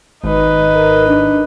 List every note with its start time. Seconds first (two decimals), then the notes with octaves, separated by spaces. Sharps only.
0.23 G#1 D#4 B4
0.74 A#4
1.08 D4